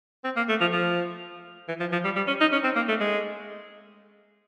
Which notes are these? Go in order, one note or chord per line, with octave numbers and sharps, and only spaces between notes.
C4
A#3
A3
F3
F3
E3
F3
F3
G3
G3
C#4
D#4
C#4
C4
A#3
A3
G#3